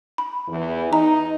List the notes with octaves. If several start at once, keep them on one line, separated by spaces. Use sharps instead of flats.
B5
E2 E3
D#4 A#5